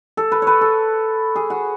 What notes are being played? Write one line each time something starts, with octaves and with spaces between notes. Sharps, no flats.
A4
B4
B4 C#5
A4
G#4
F#4